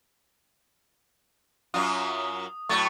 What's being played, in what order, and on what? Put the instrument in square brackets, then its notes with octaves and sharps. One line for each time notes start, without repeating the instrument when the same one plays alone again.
[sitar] F#2 F#3 F4 [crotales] D#6
[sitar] A2 F#3 A3 [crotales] C#6 A6